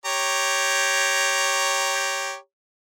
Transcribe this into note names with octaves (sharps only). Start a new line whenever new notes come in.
G4 C#5 A#5